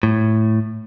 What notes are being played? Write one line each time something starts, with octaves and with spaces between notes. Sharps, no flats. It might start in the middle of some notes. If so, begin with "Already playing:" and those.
A2